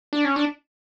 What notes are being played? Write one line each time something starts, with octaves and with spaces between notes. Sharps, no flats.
D4
C#4
D4